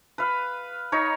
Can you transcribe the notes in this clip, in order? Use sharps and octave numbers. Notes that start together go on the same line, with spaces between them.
B4 F5
D#4 C#5